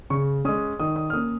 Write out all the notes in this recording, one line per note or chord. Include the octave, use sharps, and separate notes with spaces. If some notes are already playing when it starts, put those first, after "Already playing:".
C#3 C#6
G#3 C#4 D#6
D#3 D#6
D#6
F6
A#3 C#4 D#6